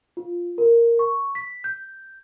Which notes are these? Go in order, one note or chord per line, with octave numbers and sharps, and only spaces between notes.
F4
A#4
C#6
B6
G6